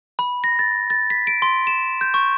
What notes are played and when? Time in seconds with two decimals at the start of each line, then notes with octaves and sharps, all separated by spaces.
0.19 B5
0.44 A#6
0.59 A6
0.90 A6
1.10 B6
1.27 D7
1.42 C6
1.67 E7
2.01 G6
2.14 C#6